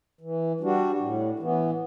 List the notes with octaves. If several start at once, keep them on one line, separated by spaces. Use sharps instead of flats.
E3
G3 D4 F#4
A2
E3 B3